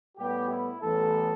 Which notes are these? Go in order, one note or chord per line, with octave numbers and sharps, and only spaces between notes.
A2 G3 B3 G4
E4
A1 A2 E3 G3 B3 A4